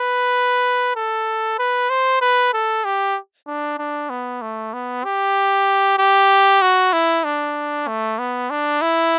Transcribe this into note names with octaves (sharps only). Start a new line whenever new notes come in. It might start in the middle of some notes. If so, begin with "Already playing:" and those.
Already playing: B4
A4
B4
C5
B4
A4
G4
D4
D4
B3
A3
B3
G4
G4
F#4
E4
D4
A3
B3
D4
E4